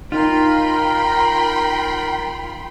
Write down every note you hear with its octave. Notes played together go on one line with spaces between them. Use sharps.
D#4 F4 A#4 G5 B5 C6